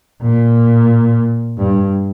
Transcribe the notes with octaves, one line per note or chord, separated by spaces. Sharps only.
A#2
G2